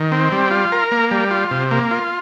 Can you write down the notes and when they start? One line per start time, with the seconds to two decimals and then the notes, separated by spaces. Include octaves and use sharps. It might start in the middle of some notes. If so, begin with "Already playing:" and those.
Already playing: D#3
0.12 C4
0.32 G3
0.51 F4
0.72 A#4
0.91 A#3
1.11 G3
1.31 F4
1.51 C3
1.71 A#3
1.91 F4